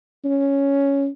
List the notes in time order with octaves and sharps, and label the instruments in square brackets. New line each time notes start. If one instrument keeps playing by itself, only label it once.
[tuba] C#4